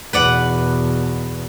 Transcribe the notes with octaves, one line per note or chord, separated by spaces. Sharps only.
E2 B2 B4 D5 F#5